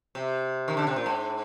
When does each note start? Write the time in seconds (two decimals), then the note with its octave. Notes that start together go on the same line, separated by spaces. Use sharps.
0.15 C3
0.68 D#3
0.77 D3
0.87 C3
0.96 A#2
1.06 G#2